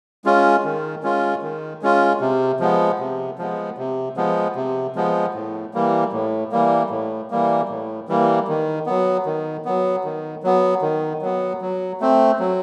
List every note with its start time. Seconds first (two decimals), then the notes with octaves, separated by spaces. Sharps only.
0.25 G#3 C#4 F4
0.64 D#3
1.03 G#3 C#4 F4
1.42 D#3
1.82 G#3 C#4 F4
2.20 C3
2.60 F3 G#3 B3
2.99 C3
3.39 F3 G#3 B3
3.78 C3
4.16 F3 G#3 B3
4.56 C3
4.96 F3 G#3 B3
5.34 A2
5.74 E3 G3 A#3
6.12 A2
6.52 E3 G3 A#3
6.90 A2
7.31 E3 G3 A#3
7.69 A2
8.08 E3 G3 A#3
8.48 D#3
8.86 F#3 B3
9.26 D#3
9.65 F#3 B3
10.04 D#3
10.43 F#3 B3
10.82 D#3
11.22 F#3 B3
11.61 F#3
12.00 A3 C4
12.40 F#3